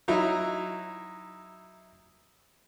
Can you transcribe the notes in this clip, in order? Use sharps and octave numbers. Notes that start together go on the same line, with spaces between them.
F#3 D#4 E4